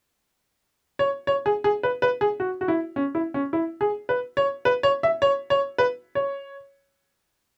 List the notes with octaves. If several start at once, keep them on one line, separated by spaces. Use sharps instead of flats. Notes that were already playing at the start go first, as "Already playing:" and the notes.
C#5
C#5
G#4
G#4
B4
B4
G#4
F#4
F#4
E4
C#4
E4
C#4
E4
G#4
B4
C#5
B4
C#5
E5
C#5
C#5
B4
C#5